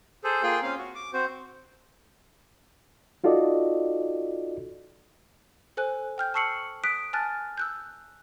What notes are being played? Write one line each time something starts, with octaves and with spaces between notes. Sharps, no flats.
G#4 A4 C5
A#3 F4 G#4 G5 C6
C4 C#4 F5
F#4
D6
C4 F#4 C5
D#4 F4 F#4 A4 D5 D#5
A4 C5 G#5 F#6
G5 F6 G6
A5 C#6 E6 C7 C#7 F#7
D#6 F#6 B6 D7
G#5 A5 F6 F#6 A6
E6 F#6 G6